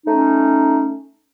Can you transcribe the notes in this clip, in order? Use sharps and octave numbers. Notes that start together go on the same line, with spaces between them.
A3 C#4 D#4